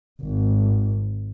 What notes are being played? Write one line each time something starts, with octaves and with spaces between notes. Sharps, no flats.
G#1